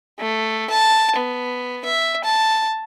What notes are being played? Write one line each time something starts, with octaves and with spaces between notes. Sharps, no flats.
A3
A5
B3
E5
A5